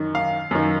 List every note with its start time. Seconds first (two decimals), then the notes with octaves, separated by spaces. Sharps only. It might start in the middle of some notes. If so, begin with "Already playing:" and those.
Already playing: F#2 D#3
0.15 F5
0.51 F#2 D#3